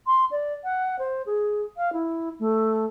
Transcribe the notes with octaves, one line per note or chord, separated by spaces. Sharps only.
C6
D5
F#5
C5
G#4
F5
E4
A3